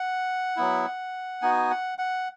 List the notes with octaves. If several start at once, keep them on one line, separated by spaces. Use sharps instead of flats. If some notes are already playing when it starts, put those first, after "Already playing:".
Already playing: F#5
F#3 B3 E4
B3 D#4 F#4 G#5
F#5
F#5